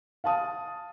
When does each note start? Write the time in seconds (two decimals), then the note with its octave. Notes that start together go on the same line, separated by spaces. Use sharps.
0.24 F5 A5 D#6